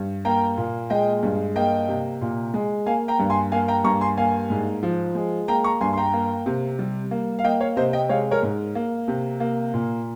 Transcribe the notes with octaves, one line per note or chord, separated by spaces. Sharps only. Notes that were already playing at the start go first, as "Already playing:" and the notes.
Already playing: G2
A#3 G5 A#5
A#2
G#3 D#5 G5
G2
A#3 D#5 G5
C3
A#2
G#3
A#3 F5 G#5
G5 A#5
G2
G#5 C6
A#3 F5 G#5
G5 A#5
G2 A#5 C#6
G#5 C6
A#3 F5 G#5
G#2
F3
G#3
A#3 G5 A#5
A#5 C#6
G2 G#5 C6
C6
G5 A#5
A#3
C3
G3
A#3
F5
A#3 D#5 G5
C#5 F5
C3 C5 D#5
D#5 G5
G#3 C#5 F5
A#4 C#5
G#2
A#3
C3
A#3
A#2